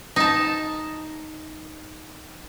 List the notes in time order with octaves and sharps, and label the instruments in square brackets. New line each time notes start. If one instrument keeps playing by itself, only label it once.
[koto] D#4 A5